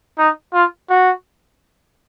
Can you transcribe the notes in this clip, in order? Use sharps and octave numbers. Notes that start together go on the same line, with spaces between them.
D#4
F4
F#4